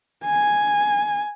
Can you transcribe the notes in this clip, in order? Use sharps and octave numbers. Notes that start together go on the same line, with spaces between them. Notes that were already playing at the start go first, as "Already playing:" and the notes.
G#5